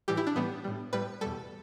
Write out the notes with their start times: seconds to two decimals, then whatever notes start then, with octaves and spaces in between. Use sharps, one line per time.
0.08 A2 E3 G3 G4
0.17 E4
0.27 D4
0.36 A2 E3 G3 B3
0.64 A2 G3
0.93 A2 G3 B4
1.21 E2 B2 G3 A4